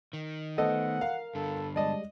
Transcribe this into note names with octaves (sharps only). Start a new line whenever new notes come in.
D#3
A3 B3 A4 C5 D#5 F#5
A#4 F5
G2 D3 A4
G3 G#3 D5 D#5 A5